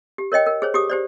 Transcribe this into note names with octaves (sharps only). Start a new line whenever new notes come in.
G4
A#4 C#5 D#5 G5
A#4
G#4 C5 C#5
G4 G#4 D6 D#6
G4 C5 D5